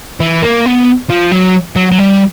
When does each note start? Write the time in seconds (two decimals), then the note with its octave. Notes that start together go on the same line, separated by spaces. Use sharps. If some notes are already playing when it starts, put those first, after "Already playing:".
0.20 E3
0.42 A#3
0.66 B3
1.10 F3
1.31 F#3
1.76 F#3
1.92 F#3
1.99 G3